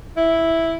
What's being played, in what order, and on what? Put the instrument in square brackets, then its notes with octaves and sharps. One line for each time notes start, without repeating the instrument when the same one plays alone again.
[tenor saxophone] E4